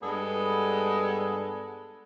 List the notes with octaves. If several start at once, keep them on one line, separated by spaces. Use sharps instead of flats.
G2 G#3 B3 D4 G#4 A4